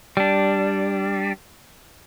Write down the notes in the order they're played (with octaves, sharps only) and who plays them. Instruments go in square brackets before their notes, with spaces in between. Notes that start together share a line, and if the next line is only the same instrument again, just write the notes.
[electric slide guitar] G3 D4